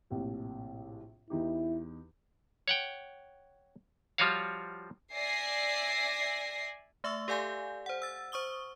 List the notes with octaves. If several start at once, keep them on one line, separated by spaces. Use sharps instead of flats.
A#1 A2 C3
E2 D#4 E4 G4
C#5 F#5 G5
F3 G3 F4 F#4 C#5 F5
D5 E5 G#5 A#6 C7
A3 E5 C#6 E6
G4 A4 D5 F5 G#5 G6
C5 F#5
E6 A6
C5 C#6 D#6 G7